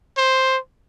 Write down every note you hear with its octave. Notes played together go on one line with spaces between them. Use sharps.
C5